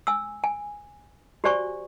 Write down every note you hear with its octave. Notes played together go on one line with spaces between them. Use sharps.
G#5 E6
G#5
F#4 G4 C5 D5 G#5 C#6